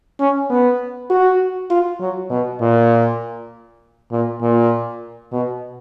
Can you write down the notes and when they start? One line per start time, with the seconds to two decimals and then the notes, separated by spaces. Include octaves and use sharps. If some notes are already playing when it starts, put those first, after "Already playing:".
0.20 C#4
0.50 B3
1.10 F#4
1.70 F4
2.00 F#3
2.30 B2
2.61 A#2
4.12 A#2
4.42 A#2
5.32 B2